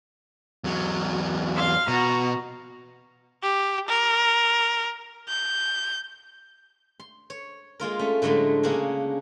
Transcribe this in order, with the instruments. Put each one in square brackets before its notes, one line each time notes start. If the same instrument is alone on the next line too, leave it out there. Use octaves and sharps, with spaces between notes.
[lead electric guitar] E2 F#3
[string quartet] F5 C6 F6
[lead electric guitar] B2 [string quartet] F#4 A#5
[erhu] G4
A#4
G6
[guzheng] C6
C#5
G#3 A#3 F4 A#4
A3 C#4
A2 D3 F#3 G#3 A3
C#3 A#3 C#4 D4 F#4 G#4